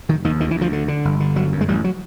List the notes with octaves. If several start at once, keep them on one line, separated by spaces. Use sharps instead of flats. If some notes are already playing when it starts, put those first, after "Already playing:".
F1 D#3
D#2 D#3
D2 D#3
E3
D2
F3
D3
D3
G1
D3
G1 F#3
F#2
G#3
A1 G3
F#3